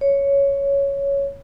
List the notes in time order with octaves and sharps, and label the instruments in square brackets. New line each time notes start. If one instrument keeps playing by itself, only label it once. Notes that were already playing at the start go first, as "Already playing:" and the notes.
[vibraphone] C#5